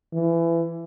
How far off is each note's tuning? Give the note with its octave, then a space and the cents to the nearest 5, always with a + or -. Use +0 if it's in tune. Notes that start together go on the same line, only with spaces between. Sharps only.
E3 +25